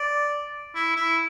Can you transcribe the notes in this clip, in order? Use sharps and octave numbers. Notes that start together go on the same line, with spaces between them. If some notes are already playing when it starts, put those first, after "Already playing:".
Already playing: D5
E4
E4